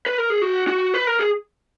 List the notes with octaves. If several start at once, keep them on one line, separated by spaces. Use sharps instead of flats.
B4
A#4
G#4
F#4
F#4
B4
A#4
G#4